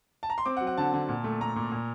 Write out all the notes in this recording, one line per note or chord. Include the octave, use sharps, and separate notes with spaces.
A5
A#5
C6
C4 D6
F#5
F#3
F#5
D3 A5
D3
A#2
A3
A3 A#5
A#2
A#2